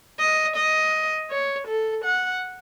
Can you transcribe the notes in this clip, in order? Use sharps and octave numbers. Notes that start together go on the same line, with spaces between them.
D#5
D#5
C#5
A4
F#5